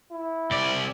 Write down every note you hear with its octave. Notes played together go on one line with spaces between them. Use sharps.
E4
C2 D5